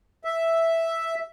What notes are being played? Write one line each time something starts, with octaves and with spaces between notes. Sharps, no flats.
E5